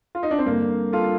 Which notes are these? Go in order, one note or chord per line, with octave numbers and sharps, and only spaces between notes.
F4
D#4
D4
C4
G2 D3 A#3
F4 A4